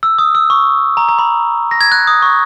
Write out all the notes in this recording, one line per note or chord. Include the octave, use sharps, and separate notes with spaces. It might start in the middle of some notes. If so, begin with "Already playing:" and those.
E6
D#6
E6
C#6
A#5
A#5
B5
A#6
G#6
F#6
D#6
C#6